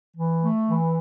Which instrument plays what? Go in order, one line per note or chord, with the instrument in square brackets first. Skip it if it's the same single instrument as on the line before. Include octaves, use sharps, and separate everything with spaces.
[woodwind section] E3
A3
E3